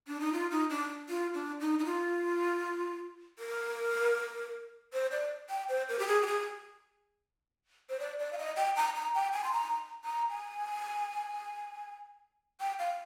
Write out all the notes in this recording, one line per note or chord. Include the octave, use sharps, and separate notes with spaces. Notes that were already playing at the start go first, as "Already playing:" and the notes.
D4
D#4
F4
D#4
D4
F4
D4
D#4
D#4
F4
A#4
C5
D5
G5
C5
A#4
G4
G#4
G4
G#4
C5
D5
D5
F5
D#5
G5
A#5
A#5
G5
G#5
C6
A#5
A#5
G#5
G5
F5